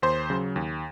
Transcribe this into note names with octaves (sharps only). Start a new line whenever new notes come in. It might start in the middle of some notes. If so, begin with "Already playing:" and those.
D#2 C5 C6
C#3 F#3
D#2